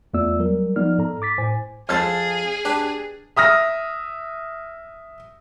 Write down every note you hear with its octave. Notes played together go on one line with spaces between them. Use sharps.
E2 A3 B3 F4 D5 E6
F#3 G3 A#4
F3 B3 D#4 D5 F6
G#2 A4 A#5
D6 A6 B6
A2 C5 G#5
F2 G#4 A4 C5 F6 A6
D4 G4 B4
E5 D#6 F6 A#6